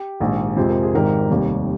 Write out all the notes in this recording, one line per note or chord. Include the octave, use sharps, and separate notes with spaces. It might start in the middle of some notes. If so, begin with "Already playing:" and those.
Already playing: G4
A#1 G#2 D#3
F2 C3 F3 G#3 C5
A#4
G#4
G#1 G#2 D#3 G4 A#4
F1 D#2 D#3 G3